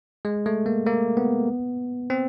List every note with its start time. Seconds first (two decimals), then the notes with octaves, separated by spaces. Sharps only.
0.25 G#3
0.46 A3
0.66 A#3
0.86 A#3
1.17 B3
2.10 C4